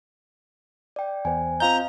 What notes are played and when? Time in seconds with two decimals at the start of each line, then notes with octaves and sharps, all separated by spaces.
0.96 D5 G5
1.25 E2 C5 G#5
1.60 C4 F4 D#5 F5 A#5 G6